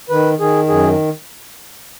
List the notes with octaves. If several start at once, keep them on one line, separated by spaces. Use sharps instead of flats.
D#3 B4
D#3 G#4
F#2 G#4